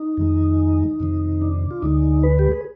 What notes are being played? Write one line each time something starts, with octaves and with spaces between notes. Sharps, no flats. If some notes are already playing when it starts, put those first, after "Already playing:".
Already playing: D#4
F2 D#3 G#3
F2 C3 D#3
D4
F4
D2 D3 G#3 D#4
B4
G4
G#4